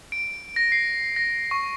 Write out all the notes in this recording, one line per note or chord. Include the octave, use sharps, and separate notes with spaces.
D7
A#6
C7
A#6
C#6